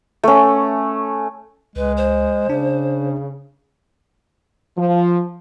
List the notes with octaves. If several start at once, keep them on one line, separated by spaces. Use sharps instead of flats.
A3 C#4
C#2 G#3 B4
C5
C#3 D4
F3